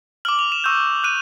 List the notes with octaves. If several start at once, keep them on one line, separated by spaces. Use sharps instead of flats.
D6 F6 F#7
F7
E7
C#6 E6 G6
F#6 D#7